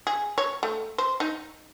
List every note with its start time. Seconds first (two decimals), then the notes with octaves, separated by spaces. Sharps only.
0.07 G#4
0.38 C#5
0.63 A3
0.98 C5
1.20 D#4